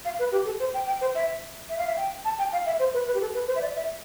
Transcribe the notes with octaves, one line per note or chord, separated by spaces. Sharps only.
F5
B4
G4
A4
C5
G5
G5
C5
E5
E5
F5
E5
G5
A5
G5
F5
E5
C5
B4
B4
G4
A4
B4
C5
E5
D5
E5